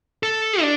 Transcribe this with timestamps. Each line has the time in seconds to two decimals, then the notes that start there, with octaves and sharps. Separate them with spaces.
0.23 A4
0.61 D4